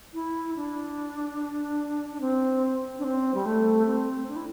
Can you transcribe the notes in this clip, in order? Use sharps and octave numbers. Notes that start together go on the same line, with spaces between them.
E4
D4
D4
C4
D4
C4
G3
A3
C4
D4
E4